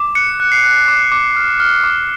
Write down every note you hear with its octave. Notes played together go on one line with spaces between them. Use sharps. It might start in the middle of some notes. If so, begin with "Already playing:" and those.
Already playing: D6
F#6 C#7
F#6
C7
F#6
D6
D6
F6
F6
D6